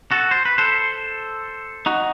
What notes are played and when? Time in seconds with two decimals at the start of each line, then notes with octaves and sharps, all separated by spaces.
0.11 F#4 A4
0.31 C5
0.45 B4
0.58 A4 C5
1.86 D#4 F#4